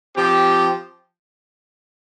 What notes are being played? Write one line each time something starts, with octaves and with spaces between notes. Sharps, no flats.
F3 C4 G4